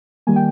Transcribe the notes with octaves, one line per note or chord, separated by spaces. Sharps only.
D#3 G3 A#3 G#5
G5